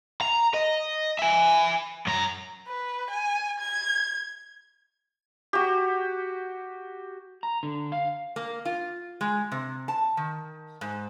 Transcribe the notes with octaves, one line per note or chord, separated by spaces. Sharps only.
A#5
D#5
E5 G#5
F#2 A#5
B4
G#5
G#6
F#4 G4
A#5
D3
F5
A#3
F4
G#3
C3
A5
D#3
G#2